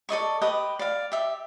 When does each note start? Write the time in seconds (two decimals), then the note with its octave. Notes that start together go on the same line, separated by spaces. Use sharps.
0.09 A4 D5 D#5 C#6
0.41 G4 B4 D#5 D#6
0.79 D5 F5
1.12 G4 E5